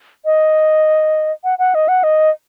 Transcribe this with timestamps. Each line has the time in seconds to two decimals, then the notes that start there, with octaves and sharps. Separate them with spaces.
0.25 D#5
1.44 F#5
1.59 F#5
1.75 D#5
1.88 F#5
2.03 D#5